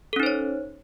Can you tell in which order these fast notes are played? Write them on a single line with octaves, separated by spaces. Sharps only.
A4 C#4 D#4 C5 C#5